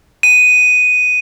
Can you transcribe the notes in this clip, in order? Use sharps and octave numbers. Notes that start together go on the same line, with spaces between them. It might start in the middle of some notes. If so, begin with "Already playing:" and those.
D#7